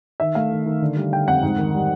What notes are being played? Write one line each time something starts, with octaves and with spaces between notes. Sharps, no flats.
D#3 E5
A3 F5
D#3
D#3
D3
G3
D3 G5
F2 F#5
G#2
D#3
G3